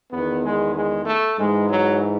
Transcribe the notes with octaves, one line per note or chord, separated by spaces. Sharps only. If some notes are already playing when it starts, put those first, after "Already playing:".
E2 D#3 B3
G#3
G#3
A3
G#2 E3 G#3
F#3